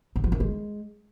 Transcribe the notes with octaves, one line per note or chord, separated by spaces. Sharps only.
D3
F3
D#3
G#3